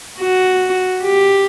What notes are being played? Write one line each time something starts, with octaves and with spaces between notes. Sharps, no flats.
F#4
G4